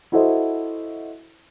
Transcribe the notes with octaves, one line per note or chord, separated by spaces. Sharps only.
E4 F#4 A4 C5 D#5 E5